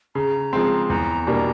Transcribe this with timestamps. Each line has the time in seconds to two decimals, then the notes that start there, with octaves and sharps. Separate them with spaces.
0.15 C#3 A#5
0.53 F3 G#3 C4
0.89 E2 A#5
1.27 B2 G3 A#3 D4